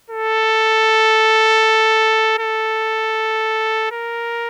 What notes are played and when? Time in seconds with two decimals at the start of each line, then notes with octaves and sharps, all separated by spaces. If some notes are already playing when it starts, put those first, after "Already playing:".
0.10 A4
2.39 A4
3.91 A#4